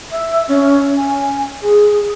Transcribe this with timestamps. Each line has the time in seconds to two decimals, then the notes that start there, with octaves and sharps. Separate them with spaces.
0.11 E5
0.48 C#4
0.97 G#5
1.62 G#4